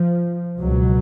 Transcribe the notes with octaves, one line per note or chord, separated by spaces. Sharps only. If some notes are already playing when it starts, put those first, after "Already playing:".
Already playing: F3
C#2 B2 F#3